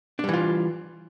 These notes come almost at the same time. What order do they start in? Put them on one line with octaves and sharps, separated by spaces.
D4 G3 E3 F4